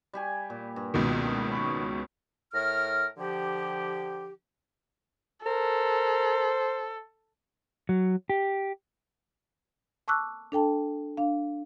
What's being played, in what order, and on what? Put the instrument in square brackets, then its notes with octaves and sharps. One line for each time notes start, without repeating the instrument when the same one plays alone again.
[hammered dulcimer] G3 G4 G#5
A#2
G2
[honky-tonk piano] C#2 B2 D#3
[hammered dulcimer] C#5 B5
[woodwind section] A2 A#4 F6
D3 F3 G4
[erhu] A4 [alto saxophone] A#4 [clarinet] C5
[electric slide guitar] F#3
G4
[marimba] A5 C#6 D6 E6 F#6
D4 A4 G5 A5
D4 F5